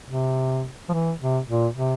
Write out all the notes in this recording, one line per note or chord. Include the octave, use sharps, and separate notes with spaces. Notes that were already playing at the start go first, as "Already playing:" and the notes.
C3
F3
E3
C3
A#2
C3